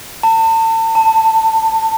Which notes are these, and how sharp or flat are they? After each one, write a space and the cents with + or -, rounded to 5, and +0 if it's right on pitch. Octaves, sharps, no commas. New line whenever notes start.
A5 +35
A5 +15